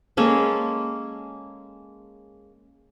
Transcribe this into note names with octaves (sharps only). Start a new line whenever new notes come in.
G#3 A#3 C#4 A4